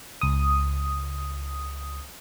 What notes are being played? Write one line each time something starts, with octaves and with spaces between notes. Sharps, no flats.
C#2 D#6